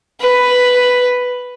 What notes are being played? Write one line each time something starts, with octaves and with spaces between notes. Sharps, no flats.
B4